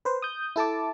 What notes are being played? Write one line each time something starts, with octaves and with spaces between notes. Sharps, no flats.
B4 C5
D#6 G6
E4 A4 A5 D6